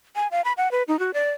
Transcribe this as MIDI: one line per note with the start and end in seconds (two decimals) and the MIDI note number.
0.16 0.28 80
0.31 0.41 77
0.45 0.53 83
0.57 0.71 78
0.71 0.83 71
0.88 0.99 63
0.99 1.11 66
1.14 1.31 74